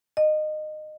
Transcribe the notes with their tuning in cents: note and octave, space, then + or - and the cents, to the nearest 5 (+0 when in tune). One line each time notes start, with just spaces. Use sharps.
D#5 -20